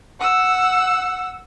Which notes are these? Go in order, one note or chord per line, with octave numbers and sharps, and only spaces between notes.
F#5 E6